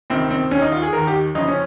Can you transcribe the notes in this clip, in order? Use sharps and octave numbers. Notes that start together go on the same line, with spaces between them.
C#2 C3 D#3 C4
C4
D#2 D#3 C#4
D#4
F4
G#4
D#2 D#3 A#4
G4
G1 F2 C#3 D#4
C#4